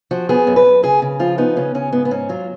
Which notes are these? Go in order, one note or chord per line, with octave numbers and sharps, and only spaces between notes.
F3 F#4
B3 G#4
F#2
B4
F#2
C#3 G#4
C#3
F3 F4
B3 D#4
C#3 C#4
C#3 C#4
G#2 B3
B3
G#2 C#4
F#3 F4